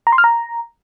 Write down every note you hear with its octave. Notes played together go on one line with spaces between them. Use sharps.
A#5
C6
F6
A#5